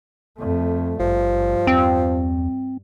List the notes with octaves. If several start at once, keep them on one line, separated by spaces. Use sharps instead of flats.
F2 A3
G#1 G2 F3
E2 C4